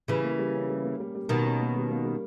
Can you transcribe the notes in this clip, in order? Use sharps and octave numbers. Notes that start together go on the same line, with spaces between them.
C#3 E3 G3
A#3
G3
C#4
G3
A#3
G3
G3
B2 D#3 G3
C#4
A#3
G3
A#3
G3